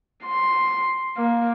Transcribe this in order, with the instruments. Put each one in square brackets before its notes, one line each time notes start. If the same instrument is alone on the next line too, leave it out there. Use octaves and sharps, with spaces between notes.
[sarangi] C6
A#3